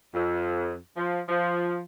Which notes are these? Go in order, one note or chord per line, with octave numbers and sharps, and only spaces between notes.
F2
F3
F3